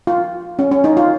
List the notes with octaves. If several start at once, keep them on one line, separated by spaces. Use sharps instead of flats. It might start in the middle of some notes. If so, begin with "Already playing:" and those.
F4
C#4
C#4
D#4
F4